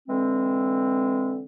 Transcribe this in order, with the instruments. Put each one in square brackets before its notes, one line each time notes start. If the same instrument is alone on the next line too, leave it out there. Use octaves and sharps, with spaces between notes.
[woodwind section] D3 E3 G#3 C4